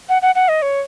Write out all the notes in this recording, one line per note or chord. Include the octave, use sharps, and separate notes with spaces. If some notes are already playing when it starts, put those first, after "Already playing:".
F#5
F#5
F#5
D#5
C#5